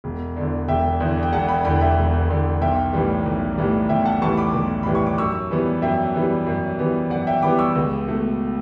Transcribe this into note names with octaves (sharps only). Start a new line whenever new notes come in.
E1
E2 D3
E1 E5 G5
E2 D3
G5
E1 F#5 A5
G5 B5
E2 D3 G5 B5
E5 G5
E1
E2 D3
B1 E5 G5
A2 E3 G3
B1
A2 E3 G3
B1 E5 G5
F#5 A5
A2 E3 G3 A5 C#6
B5 D6
B1
A2 E3 G3 B5
C#6
D6
F#2 C#6 E6
E3 G3 B3
F#2 E5 G5
E3 G3 B3
F#2
E3 G3 B3
F#2 D5 F#5
E5 G5
E3 G3 B3 B5 D6
C#6 E6
C#2
B2 A3